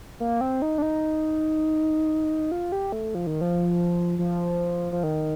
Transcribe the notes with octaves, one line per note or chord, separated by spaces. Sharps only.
A#3
C4
D#4
D4
D#4
F4
G4
A3
F3
D#3
F3
F3
F3
D#3